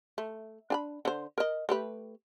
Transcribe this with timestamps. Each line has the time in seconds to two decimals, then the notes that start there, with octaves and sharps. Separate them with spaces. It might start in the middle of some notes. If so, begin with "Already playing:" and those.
0.18 A3
0.70 D4 G#5 B5
1.05 D3 C5
1.38 A#4 D#5
1.69 A3 G4 B4